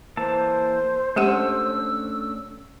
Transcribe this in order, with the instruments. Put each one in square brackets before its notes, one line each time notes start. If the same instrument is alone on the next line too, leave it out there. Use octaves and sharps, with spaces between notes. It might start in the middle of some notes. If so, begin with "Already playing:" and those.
[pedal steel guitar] E3 A#3 A5 [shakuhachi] C5
[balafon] G#3 G4 F#5 [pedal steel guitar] A3 C#4 D4 [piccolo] E6